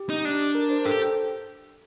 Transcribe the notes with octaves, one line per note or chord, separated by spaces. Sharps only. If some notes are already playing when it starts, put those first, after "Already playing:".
Already playing: G4
D#4
D4
A#4
C5
G4 A4